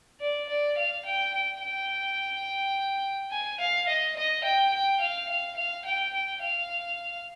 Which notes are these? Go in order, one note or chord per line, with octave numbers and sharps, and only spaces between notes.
D5
D5
F5
G5
G5
G5
G#5
F5
D#5
D#5
G5
G5
F5
F5
F5
G5
G5
F5